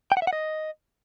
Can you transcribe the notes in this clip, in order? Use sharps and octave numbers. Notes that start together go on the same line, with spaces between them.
G5
F#5
E5
F#5
D#5